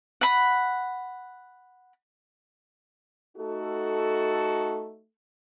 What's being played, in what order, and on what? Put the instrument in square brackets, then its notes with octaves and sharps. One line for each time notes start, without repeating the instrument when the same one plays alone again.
[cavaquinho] F#5 B5
[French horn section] A3 D#4 F#4 A4